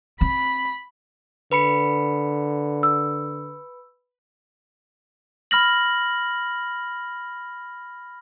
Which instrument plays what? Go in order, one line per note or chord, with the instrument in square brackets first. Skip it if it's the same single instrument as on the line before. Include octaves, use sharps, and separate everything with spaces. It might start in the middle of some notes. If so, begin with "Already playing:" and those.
[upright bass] C4 [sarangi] B5
[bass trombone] D3 [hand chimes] B4 B5 C#7
[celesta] E6
[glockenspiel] B5 F6 A#6 F#7